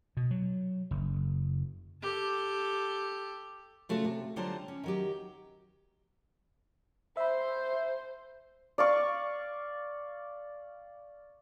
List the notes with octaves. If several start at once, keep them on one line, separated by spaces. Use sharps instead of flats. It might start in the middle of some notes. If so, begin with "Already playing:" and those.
B2
F#3
F#1
G4 A4
C#3 A3 F4 F#4 A4
C3
D3 F#3 G3 F4 C5 A5
C#4
D#3 F#3 G4
C5 E5 B5
D5 F5 C#6